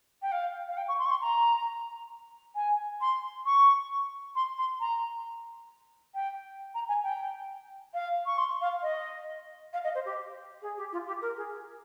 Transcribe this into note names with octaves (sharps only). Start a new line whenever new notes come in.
G5
F5
F5
G5
C#6
C6
C#6
C6
A#5
G#5
C6
C#6
C6
C6
A#5
G5
A#5
G#5
G5
F5
C#6
C6
F5
D#5
F5
D#5
C5
G4
G#4
G4
F4
G4
A#4
G#4